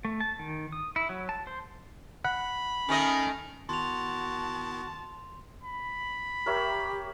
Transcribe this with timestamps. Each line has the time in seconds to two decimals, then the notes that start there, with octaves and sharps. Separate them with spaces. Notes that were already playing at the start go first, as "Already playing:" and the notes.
0.05 A3
0.20 A5
0.39 D#3
0.72 D#6
0.96 E4
1.09 F#3
1.29 A5
1.47 C5
2.25 F#5 B5
2.89 D#3 A3 C#4 D#5
3.69 D#3 B3 E4 F#4 A5 C6 F7
5.63 B5
6.46 G4 A#4 C#5 E5